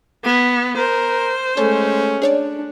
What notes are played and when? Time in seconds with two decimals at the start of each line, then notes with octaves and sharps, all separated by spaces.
0.24 B3 G#6 D#7
0.77 A#4 C5
1.57 G#3 A3 C#4 A4 C#5
2.22 D4 G#4 C#5 D5